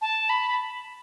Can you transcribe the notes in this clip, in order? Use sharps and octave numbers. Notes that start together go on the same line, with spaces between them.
A5
B5